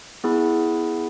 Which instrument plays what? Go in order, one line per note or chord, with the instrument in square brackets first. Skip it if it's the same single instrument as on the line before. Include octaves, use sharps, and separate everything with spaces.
[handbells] B3 E4 G#4